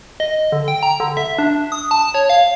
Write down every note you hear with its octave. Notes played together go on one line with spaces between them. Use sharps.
D#5
D3
G5
A#5
D3
E5
D4
D#6
A5
C#5
F5